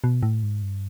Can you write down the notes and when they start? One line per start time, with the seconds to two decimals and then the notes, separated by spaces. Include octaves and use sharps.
0.04 B2
0.23 A2
0.43 G#2
0.62 G2